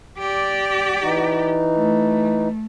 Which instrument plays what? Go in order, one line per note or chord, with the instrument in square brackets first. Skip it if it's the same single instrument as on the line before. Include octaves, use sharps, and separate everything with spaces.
[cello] G4 D5
[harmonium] E3 D#4
[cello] A3